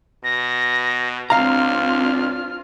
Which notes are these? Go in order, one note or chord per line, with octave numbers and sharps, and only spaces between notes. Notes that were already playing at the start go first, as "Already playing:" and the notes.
B2 A#6
C#2 C4 D4 F4 F5 A#5 F6